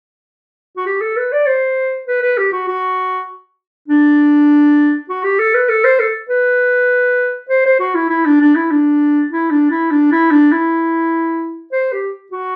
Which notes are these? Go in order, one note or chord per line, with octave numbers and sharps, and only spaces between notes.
F#4
G4
A4
B4
D5
C5
B4
B4
G4
F#4
F#4
D4
F#4
G4
A4
B4
A4
C5
A4
B4
C5
C5
F#4
E4
E4
D4
D4
E4
D4
E4
D4
E4
D4
E4
D4
E4
C5
G4
F#4